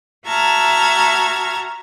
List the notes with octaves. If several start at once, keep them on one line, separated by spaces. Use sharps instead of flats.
F#4 E5 A5 A#5 F6 G#6